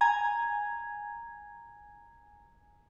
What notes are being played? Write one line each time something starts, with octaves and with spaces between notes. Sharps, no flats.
G#5 A#5 G#6